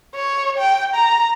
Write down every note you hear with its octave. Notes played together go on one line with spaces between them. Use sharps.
C#5
G5
A#5